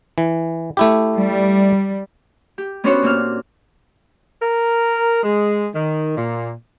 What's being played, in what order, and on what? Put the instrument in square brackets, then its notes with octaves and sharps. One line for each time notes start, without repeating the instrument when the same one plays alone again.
[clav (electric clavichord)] E3
A3 E4 G4
[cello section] G3
[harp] G4
B3 C#4 D4 F#4 C5 C#5
A#2 C4 F6
[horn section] A#4
G#3
D#3
A#2